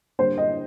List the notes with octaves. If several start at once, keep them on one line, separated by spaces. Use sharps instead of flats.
D3 G3 A#3 C5
D#5